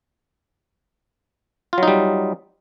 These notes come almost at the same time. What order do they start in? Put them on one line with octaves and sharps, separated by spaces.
F4 F#3 D#4 G3